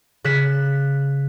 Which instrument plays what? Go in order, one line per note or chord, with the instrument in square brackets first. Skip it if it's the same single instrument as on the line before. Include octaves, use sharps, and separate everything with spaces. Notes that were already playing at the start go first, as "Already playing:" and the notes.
[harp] C#3 F#6 B6 E7